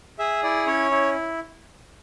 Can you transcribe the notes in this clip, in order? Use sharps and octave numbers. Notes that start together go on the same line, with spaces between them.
G#4 E5
E4 D5
C#4 C#5
E4